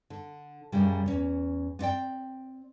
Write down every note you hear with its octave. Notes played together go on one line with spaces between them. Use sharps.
D3
F#2 A#2 C#3 G3
E2 C#4
B3 C4 E4 D5 G5